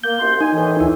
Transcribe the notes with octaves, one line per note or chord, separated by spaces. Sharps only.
A#3 G6
C2 F#2 C6
D#4 G#5
A2 D#3 E3
D2 E4